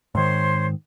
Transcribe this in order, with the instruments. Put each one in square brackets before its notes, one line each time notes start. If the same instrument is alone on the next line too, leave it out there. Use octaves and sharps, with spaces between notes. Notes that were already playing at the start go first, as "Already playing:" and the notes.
[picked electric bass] G#2 D#3 [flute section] C5 C#5 C6